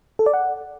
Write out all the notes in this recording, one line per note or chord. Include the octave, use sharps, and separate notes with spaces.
A4
D5
F#5